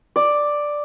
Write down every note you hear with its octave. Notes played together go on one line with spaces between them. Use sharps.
D5